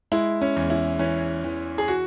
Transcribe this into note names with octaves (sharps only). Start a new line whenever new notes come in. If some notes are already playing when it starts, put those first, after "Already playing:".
G#3 E4
C#4
E2
E4
E3 C#4
E3
G#4
F#4